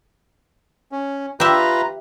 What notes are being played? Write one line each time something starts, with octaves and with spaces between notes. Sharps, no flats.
C#4
F4 G4 B4 E5 A#5